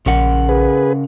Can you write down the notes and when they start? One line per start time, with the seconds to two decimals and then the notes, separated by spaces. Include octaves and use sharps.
0.06 A#1 C#3 A#4 F#5
0.49 G#4 B4